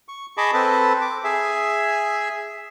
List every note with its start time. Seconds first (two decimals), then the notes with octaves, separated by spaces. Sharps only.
0.08 C#6
0.37 G#4 D#5 A5 B5 C#6 D6
0.54 C4 A4 B4
1.01 D6
1.24 G#4 E5